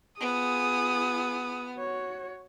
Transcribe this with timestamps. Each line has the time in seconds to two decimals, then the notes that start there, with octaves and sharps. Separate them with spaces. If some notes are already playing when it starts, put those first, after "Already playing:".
0.21 B3 F4 G#4 D#6
1.76 F#4 C#5